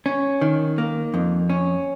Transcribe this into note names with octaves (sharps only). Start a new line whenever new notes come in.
C#4
D#3
A#3
F2
C#4